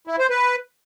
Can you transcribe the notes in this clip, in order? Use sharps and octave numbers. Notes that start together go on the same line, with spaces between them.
E4
C5
B4